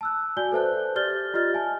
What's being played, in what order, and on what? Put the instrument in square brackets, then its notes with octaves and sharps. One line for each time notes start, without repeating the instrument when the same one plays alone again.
[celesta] A5 E6 F#6
F#4 D5 G#5 G6 G7
A4 B4 C5 E5 A5 F#6
G4 D5 F6 G6 A6 G7
F4 G4 D#5 F6 A6
E5 G#5 A5